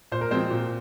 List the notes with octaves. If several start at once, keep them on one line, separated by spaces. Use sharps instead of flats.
A#2 C5
A#4
F3 G#3 C4 C5
A#2